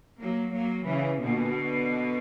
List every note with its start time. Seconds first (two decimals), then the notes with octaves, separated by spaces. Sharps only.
0.20 F#3 A#3
0.54 F#3 A#3
0.88 C#3 E3
1.21 B2 D3